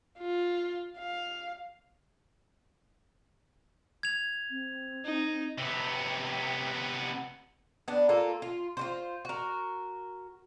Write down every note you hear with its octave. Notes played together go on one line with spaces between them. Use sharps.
F4
F5
G#6 F7
C4
D#4
C3 B3
B3 D4
A#3 F4 A4
F4
F4 F#4 C5
F#4 A#4